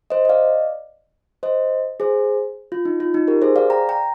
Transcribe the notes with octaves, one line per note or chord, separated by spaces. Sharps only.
C5 D#5
D#5
D5 F5
C5 D#5
G#4 C5
F4
D#4
F4
D#4
G4 A#4
G#4 C5
D5 F5
G5 A#5
G5 A#5